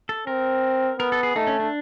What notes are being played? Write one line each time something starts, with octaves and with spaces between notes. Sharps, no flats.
A4
C4 A#4
B3 A#4
A4
G#4
A3 D#4
C#4
D4